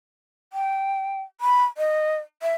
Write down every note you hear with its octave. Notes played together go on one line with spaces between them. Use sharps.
G5
B5
D#5
E5